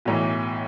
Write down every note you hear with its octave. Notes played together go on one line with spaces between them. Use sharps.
B1 A2 E3